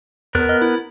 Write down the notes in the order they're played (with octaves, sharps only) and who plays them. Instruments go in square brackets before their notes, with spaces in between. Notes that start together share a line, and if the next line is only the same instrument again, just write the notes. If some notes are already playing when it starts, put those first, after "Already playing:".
[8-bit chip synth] E2 [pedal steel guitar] B3 A#4 F#6
[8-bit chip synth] D#5 F6
E4